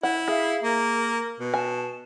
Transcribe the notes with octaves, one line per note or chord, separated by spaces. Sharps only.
E4 F#5
G#4 E5 F5
A#3 A#4
B2
G#5 A5